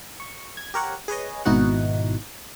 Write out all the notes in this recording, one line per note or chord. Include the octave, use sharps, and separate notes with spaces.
C#6
G#6
G4 A#4 C#5 F#5
G#4 B4 C#5 D#5
G#1 B2 D#4 E4 F#4 F#5